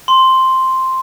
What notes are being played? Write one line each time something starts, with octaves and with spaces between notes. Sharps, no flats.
C6